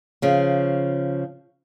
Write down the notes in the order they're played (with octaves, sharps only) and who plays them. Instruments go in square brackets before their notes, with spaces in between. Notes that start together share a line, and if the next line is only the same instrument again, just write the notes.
[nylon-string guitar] C#3 F3